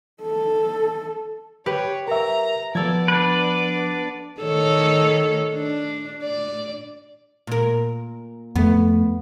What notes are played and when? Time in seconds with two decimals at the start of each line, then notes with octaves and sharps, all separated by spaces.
0.22 A4
1.66 G4 B4 C#5
2.08 A#4 E5 A#5
2.75 F3 B3 A4 D5 G#6
3.08 D4 B4
4.41 D#3 A4 C#5
5.54 D4
6.23 D5
7.47 A#2 A#4
8.56 F2 A3 B3